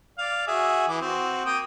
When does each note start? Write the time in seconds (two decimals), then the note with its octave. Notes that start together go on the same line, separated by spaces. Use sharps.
0.18 D5 F5
0.47 F#4 G#4 E5
0.88 E3 D6
1.01 C4 F#4
1.45 A#3 G5 D#6